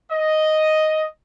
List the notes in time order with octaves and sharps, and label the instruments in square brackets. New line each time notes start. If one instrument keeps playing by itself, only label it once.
[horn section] D#5